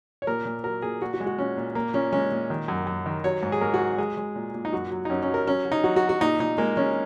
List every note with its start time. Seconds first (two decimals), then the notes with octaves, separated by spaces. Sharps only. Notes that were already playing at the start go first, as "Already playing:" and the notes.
0.22 C#5
0.27 A#2 A#4
0.45 A#2
0.64 F#3 A#4
0.82 A#2 G#4
1.02 A#2 F#4
1.14 F#4
1.20 G#3
1.26 F#4
1.38 A#2 C#4
1.57 A#2
1.75 A#2 A#3
1.94 A#2 C#4
2.13 G#3 C#4
2.31 A#2
2.50 D#3
2.68 F#2
2.87 F#2
3.06 D#3
3.24 F#3 C#5
3.43 G#2
3.52 G#4
3.61 G#2 A#4
3.74 F#4
3.80 F#3
3.98 G#3 G#4
4.17 G#3
4.36 A#2
4.54 A#2
4.65 D#4
4.73 F#2 F#4
4.91 F#3
5.05 D#4
5.10 F#2 C#4
5.22 C#4
5.28 F#3
5.34 A#4
5.47 F#3 C#4
5.65 F#3
5.72 D#4
5.84 F#3 F#4
5.96 F#4
6.03 F#3
6.09 F#4
6.21 A#2 D#4
6.40 A#2 D#4
6.58 G#3 A#3
6.77 G#3 C#4